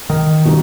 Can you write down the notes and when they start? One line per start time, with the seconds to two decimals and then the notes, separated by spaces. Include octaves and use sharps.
0.10 D#3
0.45 B2 G3 D#4